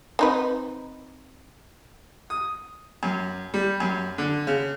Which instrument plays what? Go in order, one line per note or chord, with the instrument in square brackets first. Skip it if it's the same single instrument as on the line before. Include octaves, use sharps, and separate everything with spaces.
[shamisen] C4 D#4 B4
[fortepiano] D#6
F#2
G3
F#2
D3
C#3